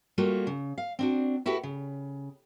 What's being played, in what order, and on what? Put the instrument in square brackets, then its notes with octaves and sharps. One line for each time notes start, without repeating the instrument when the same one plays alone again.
[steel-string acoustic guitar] G3 A3 A#3 F4 F#4
C#3
F5
C4 D4 F#4
E4 F#4 G4 A4 B4
C#3